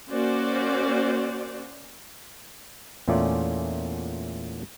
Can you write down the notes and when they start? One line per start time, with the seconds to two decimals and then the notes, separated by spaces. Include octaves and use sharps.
0.10 A#3 C#4 F#4 C5 D5
3.08 E2 A#2 A3 C#4 F4 D5